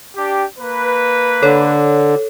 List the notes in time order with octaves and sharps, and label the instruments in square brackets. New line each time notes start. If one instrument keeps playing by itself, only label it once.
[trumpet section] D4 G4
A#3 B4
[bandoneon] D3 [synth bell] A4 C#5